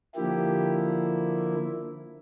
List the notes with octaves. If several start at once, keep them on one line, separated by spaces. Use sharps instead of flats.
D3 F3 A#3 E4 G4